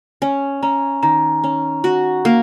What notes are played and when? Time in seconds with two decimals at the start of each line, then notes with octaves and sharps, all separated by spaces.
0.22 C#4 G#5
0.63 C#4 A#5
1.03 D#3 A#5
1.44 C#4
1.84 F#4
2.25 A#3